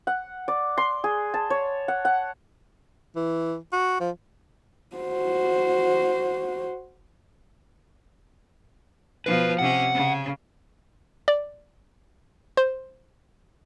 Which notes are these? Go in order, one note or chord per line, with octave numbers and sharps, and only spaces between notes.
F#5
D5
C6
G#4
A5
C#5
F#5
F#5
E3
F#4
F3
F#4 C5
B2 F3 B4
C3 C#4 F#5
C#3
D5
C5